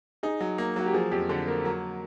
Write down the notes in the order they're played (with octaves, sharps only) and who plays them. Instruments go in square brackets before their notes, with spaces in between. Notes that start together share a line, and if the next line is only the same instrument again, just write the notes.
[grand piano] D#4 [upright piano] G#4
[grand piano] F#3
A#3
[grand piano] F#3 [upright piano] F#4
[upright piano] G4
[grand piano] F3 [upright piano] G#4
[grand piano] F2 [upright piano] G4
[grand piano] D3 [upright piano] A4
[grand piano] A#3 [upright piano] A#4
[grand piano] F#3 [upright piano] A#4